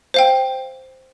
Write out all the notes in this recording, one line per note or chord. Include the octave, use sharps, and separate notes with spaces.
C5 F5 G5